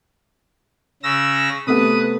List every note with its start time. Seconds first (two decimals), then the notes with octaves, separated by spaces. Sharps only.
1.03 C#3 E6 A#6
1.67 C3 A3 B3 B4 D#6